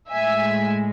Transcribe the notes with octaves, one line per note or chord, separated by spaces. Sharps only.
A2 G#3 E5 G#5